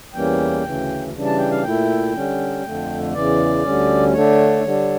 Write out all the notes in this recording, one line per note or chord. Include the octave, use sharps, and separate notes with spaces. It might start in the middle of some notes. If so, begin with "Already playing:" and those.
E2 E3 G3 A#3 C#4 G5
D2 C#3 E3
C#3 E3 G3 D4
A5
G5
F5
A#2 A3 E4 G5
D3 G3 C#4
F2 D3 A3
E2 C#3 E3 D5
D2 D3 G3 C#4
D3 A3 D4 C#5
D3 G3 D4